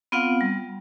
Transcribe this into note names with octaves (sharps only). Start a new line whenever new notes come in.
B3 C4 F4 F5 F#5
G3